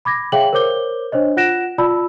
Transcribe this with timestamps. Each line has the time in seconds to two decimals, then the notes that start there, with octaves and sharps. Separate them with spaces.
0.05 B5 D6 G#6 A#6
0.32 G#4 C#5 E5 F5 G5 F#7
0.53 A#4 C5 C#5 D6 G6 G7
1.12 D4 C5 C#5 D#5
1.37 F4 F#5 F#6 A#6 D7 E7
1.78 F4 D5 A5 B5 E6